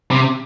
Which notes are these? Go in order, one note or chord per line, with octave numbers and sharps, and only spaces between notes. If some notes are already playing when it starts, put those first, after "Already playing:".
C3